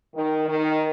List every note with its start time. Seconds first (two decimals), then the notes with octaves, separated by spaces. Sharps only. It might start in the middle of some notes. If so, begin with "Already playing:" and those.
0.15 D#3
0.48 D#3